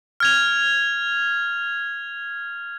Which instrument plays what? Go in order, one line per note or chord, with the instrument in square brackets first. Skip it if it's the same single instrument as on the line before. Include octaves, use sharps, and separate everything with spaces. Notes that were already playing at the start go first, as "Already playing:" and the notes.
[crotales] F6 G#6 F7